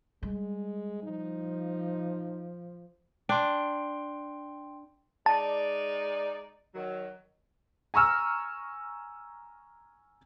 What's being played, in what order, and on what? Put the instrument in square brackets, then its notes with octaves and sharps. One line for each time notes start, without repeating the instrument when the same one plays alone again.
[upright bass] G3 [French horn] G#3
[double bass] F3 [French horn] D#4
[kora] D4 [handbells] G5 C6
[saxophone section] G#3 D#4 D5 [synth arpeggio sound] A5
[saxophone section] D#3 F#3
[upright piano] G#5 A#5 C#6 E6 F6